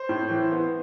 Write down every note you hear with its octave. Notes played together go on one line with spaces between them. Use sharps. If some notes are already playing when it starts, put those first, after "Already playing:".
Already playing: C5
A2
E3
B3